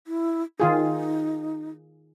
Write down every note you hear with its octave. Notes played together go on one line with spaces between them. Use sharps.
E4
D#3 D#4 F4 G#4